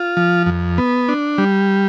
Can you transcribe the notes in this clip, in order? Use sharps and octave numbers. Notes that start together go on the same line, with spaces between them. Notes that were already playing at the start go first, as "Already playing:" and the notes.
Already playing: F4
F3
F2
B3
D4
G3